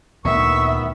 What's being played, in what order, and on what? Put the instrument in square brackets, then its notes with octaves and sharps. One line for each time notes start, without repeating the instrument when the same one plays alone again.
[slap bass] D2 A#2 [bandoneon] D#3 B3 [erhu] E5 [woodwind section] C#6